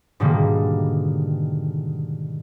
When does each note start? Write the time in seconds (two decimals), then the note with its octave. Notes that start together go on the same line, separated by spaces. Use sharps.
0.20 G#2 B2 D3 D#3 G3 A#3